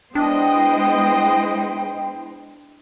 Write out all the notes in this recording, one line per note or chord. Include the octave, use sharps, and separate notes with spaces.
G#3 B3 D4 E4 C5 D#5 G5